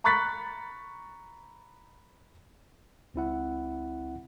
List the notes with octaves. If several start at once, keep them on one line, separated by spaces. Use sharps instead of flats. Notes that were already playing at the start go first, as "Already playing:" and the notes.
A#5 B5 C#6 F#6 A6 B6
C#2 C4 E4 F#5